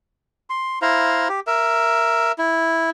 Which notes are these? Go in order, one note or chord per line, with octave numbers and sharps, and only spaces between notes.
C6
E4 C5 F5 A#5
G4
A#4 E5
E4